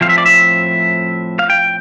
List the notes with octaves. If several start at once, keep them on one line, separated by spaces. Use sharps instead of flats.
A2 F3 A3 C4 F5
E5
D5
E5
F5
G5